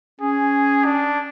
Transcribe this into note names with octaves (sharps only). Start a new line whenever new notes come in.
C#4 G#4
D4